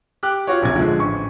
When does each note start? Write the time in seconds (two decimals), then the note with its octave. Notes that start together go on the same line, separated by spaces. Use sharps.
0.23 G4 D6 F#6
0.47 F4 F#4 C#5
0.61 D1 A#1 C3 G#6
0.76 D3 F3 G#3
0.99 A1 C#6